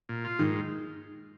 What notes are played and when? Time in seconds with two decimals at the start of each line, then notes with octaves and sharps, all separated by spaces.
0.09 A#2
0.24 F4
0.39 G#2 D#3